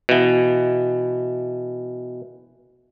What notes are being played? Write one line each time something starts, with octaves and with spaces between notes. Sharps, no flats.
B2 E3